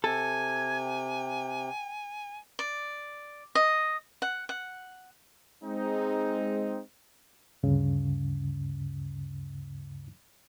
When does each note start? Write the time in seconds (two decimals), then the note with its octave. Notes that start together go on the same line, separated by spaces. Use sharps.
0.04 C3 A4 G#5 G#6
0.85 G5
2.59 D5
3.55 D#5
4.22 F#5
4.49 F#5
5.64 G#3 C4 D#4
7.63 D2 G2 C#3